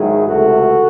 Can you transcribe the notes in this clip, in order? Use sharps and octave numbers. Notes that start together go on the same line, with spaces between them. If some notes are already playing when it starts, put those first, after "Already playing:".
Already playing: G#2 D#3 F#3 E4 G#4
C#2 C3 E3 A3 F#4 A4